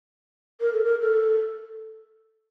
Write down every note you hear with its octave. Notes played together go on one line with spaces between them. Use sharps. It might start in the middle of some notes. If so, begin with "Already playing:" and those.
A#4
A4
A#4
A4